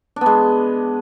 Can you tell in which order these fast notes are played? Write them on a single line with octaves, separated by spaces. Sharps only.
D4 B3 G#3